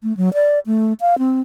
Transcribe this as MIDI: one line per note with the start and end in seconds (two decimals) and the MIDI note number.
0.03 0.16 57
0.17 0.33 54
0.34 0.59 74
0.66 0.93 57
1.01 1.18 77
1.18 1.41 60